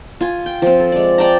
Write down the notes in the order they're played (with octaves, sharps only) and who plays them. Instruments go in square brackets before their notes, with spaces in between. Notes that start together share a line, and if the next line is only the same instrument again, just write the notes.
[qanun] F4 G#5
G5
F3 C4
A4
G#3 D5
D5 G5 A5 A#5